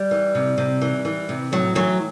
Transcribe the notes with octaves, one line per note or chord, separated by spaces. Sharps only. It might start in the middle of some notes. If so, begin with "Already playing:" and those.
Already playing: G3
E3
C3
C3
E3
E3
C3
A2 F#3
E3 F#3